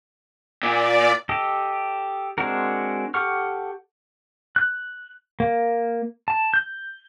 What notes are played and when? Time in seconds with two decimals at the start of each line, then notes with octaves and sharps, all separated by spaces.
0.63 A#2 D5
1.29 G4 A4 D#5
2.38 G#3 C4 D4 F#4 A#4
3.14 G4 A4 F#5 C#6 F6
4.56 F#6
5.40 A#3
6.28 A5
6.54 G6